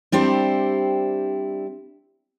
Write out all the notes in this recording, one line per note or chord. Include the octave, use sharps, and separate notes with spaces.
G3 C4 D4 E4 G4 C5